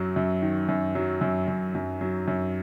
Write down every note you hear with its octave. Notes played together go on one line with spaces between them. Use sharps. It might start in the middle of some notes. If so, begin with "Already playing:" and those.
Already playing: F#2 F#3
F#2
D#3
F#2
F#3
F#2
F#2
F#2
F#3
F#2